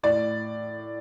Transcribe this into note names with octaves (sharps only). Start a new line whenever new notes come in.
A2 D5